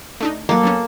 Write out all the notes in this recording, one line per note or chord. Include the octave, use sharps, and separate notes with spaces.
A3 D4 D#4
D#3 F#3 A#3 A4
F#3 B3 C#4